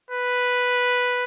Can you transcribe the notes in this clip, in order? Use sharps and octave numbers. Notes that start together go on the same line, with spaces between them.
B4